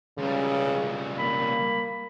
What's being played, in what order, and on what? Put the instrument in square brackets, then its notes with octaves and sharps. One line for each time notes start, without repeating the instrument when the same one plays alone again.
[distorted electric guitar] C#2 G3 [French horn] C#3
[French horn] A#3 [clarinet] B5